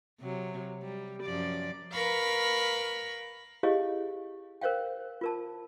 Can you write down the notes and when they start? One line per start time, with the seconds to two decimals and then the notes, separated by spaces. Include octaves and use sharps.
0.21 C3 F#3
0.84 G3
1.23 F#2 F3 D5
1.92 A#4 B4 F5 B5 C#6
3.63 E4 G4 G#4 C#5 D#5 F5
4.61 A#4 C5 C#5 F5 G5
5.21 F4 A#4 A5